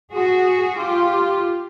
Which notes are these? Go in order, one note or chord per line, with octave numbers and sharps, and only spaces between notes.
F#4 G#4
F4 G4